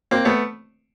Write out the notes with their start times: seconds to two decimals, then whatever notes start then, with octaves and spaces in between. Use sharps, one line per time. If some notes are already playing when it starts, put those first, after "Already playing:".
0.11 A#3 C4
0.25 A3 B3